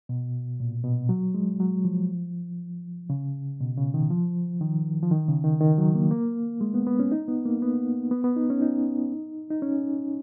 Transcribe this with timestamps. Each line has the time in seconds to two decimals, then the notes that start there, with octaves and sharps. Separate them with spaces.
0.09 B2
0.60 A#2
0.84 B2
1.09 F#3
1.34 G#3
1.60 F#3
1.85 F3
3.10 C#3
3.61 B2
3.77 C#3
3.94 D#3
4.10 F3
4.61 D#3
5.03 F3
5.11 D#3
5.28 C#3
5.44 D#3
5.60 D#3
5.78 F#3
5.95 A#3
6.11 A#3
6.61 G#3
6.74 B3
6.87 B3
6.99 C#4
7.12 D#4
7.28 B3
7.45 A#3
7.62 B3
8.11 B3
8.24 B3
8.36 D#4
8.50 C#4
8.62 D#4
9.50 D#4
9.62 C#4